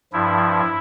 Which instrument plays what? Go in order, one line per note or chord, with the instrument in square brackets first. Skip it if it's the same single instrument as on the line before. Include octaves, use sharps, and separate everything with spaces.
[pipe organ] G2 F3 E4